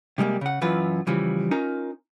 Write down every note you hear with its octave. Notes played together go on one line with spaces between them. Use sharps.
C3 G3 G#3 A#3
C#3 F#5
F#2 E3 F4 B4
C#3 E3 F3 G3
C#4 D#4 F4 A#4